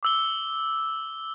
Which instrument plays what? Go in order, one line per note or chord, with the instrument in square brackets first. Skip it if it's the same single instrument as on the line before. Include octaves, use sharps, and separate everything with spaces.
[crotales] D6 E6 G7